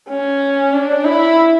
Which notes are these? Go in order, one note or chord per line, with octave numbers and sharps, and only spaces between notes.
C#4
D4
E4